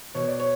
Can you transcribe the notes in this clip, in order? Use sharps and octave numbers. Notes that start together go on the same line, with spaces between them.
B2 C#5
D5
C#5